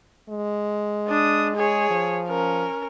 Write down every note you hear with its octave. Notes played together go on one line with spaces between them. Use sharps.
G#3
D4 D#6
G#4 C#5
F3
C#4 A#4